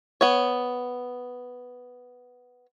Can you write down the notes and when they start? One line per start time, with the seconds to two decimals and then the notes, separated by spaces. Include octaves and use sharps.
0.21 B3 C#5